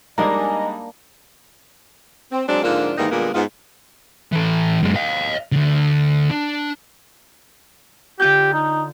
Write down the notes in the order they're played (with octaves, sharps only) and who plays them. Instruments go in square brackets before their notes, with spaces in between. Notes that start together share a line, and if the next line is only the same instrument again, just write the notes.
[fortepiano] G3 G#3 D#4 [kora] A#3 D4 [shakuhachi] D#5 [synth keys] G#5 A#5
[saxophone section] C4
F#3 G#3 C4 D4
G#2 D3 F3 A#3 D4 F4
G#2 D#3 E3 G3 A#3 D#4
A#2 D3 G3 G#3 A#3 B3
G#2 B3 F4
[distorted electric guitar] E3 A4
F#2 G#3
D#5 F5
D2 D3
D4
[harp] D3 F4 G6 [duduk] G4
[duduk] D#4